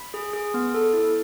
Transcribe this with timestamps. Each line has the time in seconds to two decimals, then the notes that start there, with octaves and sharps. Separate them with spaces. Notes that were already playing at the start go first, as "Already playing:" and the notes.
Already playing: B5
0.14 G#4
0.33 G#4
0.54 B3
0.74 A4
0.93 E4